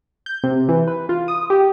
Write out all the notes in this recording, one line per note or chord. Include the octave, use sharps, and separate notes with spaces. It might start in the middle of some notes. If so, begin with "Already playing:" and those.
G6
C3
E3
B4
F4
D#6
G4